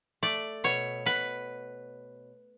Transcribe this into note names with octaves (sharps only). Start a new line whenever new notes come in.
A3 D5
B2 C#5
B2 B4